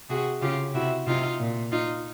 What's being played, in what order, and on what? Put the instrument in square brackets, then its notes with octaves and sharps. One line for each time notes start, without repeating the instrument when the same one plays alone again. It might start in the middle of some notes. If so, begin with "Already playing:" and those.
[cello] C3 [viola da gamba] F#4 G#4
[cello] C#3 [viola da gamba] F4 G4
[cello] C3 [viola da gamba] E4 F#4
[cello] C3 [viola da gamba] D#4 F4
[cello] A#2
[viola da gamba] D#4 F4